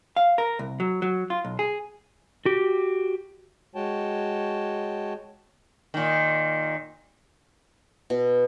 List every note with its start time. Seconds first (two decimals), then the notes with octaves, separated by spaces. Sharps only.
0.17 F5
0.38 A#4
0.59 C2
0.80 F#3
1.02 F#3
1.30 F4
1.45 B1
1.59 G#4
2.45 F#4 G4
3.75 G#3 F#4 C#5 G5 A5
5.94 A#2 D#3
8.10 B2